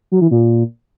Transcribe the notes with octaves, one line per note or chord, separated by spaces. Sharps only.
F#3
E3
A#2